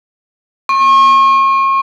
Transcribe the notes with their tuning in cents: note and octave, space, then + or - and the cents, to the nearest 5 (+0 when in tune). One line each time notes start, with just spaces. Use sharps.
C#6 -40